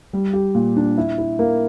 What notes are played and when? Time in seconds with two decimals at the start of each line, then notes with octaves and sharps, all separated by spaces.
0.13 G3
0.33 G4
0.55 A#2
0.77 D4
0.98 E4
1.18 E4
1.39 A#3